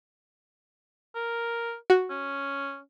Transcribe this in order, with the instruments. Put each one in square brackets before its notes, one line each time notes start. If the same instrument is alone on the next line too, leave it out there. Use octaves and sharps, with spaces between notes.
[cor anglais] A#4
[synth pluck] F#4
[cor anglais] C#4